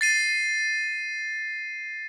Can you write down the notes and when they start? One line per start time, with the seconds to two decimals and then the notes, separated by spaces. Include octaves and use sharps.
0.01 A6 C7 D#7